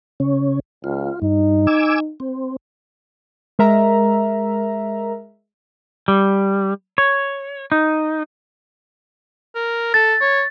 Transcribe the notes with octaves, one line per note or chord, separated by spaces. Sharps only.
C#3 C#4
C#2 F4
G2 D#4
G#5 D6 E6
C4
G#3 A#4 E5 A#5
G3
C#5
D#4
A#4
A4 A6
C#5